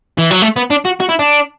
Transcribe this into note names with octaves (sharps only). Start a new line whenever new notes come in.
E3
F#3
A3
B3
D4
F#4
F#4
E4
D4